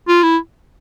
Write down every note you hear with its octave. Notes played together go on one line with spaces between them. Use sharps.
F4
E4